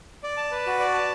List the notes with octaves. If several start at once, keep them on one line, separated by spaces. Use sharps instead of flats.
D5
A5
B4
F#4
D5
A5